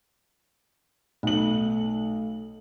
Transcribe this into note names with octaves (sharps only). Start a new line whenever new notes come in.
B1 A3 F#7